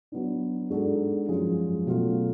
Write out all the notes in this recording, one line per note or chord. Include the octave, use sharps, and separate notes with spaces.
F#3 B3 D4
G#2 G#3 D4 F#4 A4
F#2 F3 G#3
B2 F#3 A3 C#4 F4